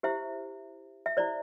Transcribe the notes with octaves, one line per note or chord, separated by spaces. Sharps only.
E4 G4 C5 E5
E5
E4 G4 C5 D5